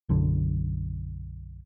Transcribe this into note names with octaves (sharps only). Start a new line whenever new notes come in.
B1 F#2 D3